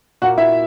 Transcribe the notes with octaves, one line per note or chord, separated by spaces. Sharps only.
A#2 A#3 F#4 F#5
E4 E5